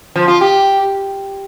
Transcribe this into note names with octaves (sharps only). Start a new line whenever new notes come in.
F3
F4
G4